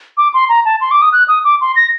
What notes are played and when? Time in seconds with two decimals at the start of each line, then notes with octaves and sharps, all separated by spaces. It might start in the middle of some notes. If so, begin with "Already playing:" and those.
0.17 D6
0.34 C6
0.49 A#5
0.65 A5
0.81 C6
0.91 D6
1.02 D#6
1.13 F#6
1.28 D#6
1.44 D6
1.61 C6
1.76 A#6